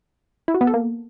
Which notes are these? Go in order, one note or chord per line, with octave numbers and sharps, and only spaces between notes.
E4
F#4
B3
A4
A#3